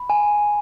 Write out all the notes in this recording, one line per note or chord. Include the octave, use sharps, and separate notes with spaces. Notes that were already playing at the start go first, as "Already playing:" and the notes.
Already playing: B5
G#5